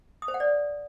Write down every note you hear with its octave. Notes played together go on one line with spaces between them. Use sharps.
D#6
C5
F#5
D5